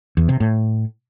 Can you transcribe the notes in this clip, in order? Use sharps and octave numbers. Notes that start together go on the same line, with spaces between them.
E2
C3
A2